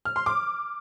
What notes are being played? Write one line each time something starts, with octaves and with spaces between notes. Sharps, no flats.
F6
C6
D6